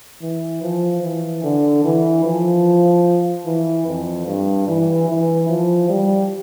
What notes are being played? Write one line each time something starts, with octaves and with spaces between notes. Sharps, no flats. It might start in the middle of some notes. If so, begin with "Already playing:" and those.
E3
F3
E3
D3
E3
F3
E3
F2
G2
E3
E3
F3
G3